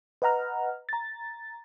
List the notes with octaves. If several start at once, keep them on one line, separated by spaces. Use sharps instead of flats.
B4 D#5 F#5 A#5 F6
A#5 A6